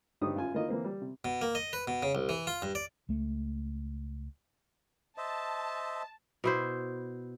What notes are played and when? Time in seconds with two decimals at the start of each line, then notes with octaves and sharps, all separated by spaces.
0.21 G2 C4 D#4 G4 D#6
0.36 F#2 F4 G#5
0.54 D#3 A#3 E4 F4 A#4 D#5
0.68 E3 A#3 C4
0.84 G3
1.01 C3
1.25 B2
1.41 A#3
1.55 D#5
1.73 B4
1.88 B2
2.03 C#3
2.15 C2
2.29 E3
2.47 F4
2.62 G2
2.75 D5
3.09 C#2 A3
5.18 C5 D#5 E5 A5
6.44 B2 E4 C5